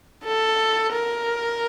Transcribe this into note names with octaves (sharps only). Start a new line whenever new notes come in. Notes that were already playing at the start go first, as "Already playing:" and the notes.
A4
A#4